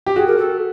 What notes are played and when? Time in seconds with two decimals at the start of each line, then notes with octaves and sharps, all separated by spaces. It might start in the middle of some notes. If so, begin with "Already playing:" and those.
0.06 G4
0.16 F#4 G#4
0.27 A#4
0.38 A4